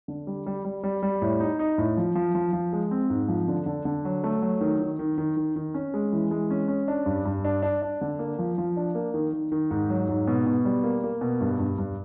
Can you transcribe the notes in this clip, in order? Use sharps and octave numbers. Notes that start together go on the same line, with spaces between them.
D3
G3
G3
G3
G3
G3
A2
D#4
D#4
A2
F3
F3
F3
F3
G#3
C4
G#2
F3
D3
D3
D3
F#3
A3
F#3
D#3
D#3
D#3
D#3
D#3
D#3
C#4
G#3
E3
G#3
C#4
C#4
D4
G2
G2
D4
D4
D4
D3
A#3
F3
F3
D4
A#3
D#3
D#3
D#3
G#2
F#3
G#2
B2
B2
G3
A#3
A#3
B2
G2
G2
G2